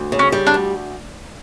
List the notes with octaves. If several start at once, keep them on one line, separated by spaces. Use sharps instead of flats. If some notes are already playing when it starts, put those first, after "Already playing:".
Already playing: D2
C#3
C#4
G3
D4
D2